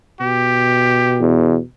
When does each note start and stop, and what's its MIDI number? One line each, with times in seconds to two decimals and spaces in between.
0.21 1.63 47
0.21 1.23 67
1.21 1.56 40